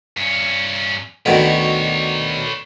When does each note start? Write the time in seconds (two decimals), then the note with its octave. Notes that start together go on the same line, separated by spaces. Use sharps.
0.17 G2 C#4
1.26 D2 B2 D#3 B4 C#5